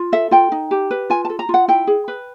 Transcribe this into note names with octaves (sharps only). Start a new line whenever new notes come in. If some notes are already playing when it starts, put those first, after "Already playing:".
Already playing: F4
A4 E5
F4 G5
D#4
G4
B4
F4 G#5
A5
A4
A#5
F4
F#5
E4 G5
G#4
B4